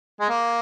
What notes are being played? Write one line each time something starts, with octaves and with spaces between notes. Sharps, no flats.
G#3
A#3